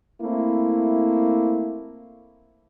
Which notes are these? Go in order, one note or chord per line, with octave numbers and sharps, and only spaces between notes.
A3 A#3 C4 E4